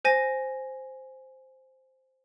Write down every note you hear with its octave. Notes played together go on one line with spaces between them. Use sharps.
C5 G#5 A#6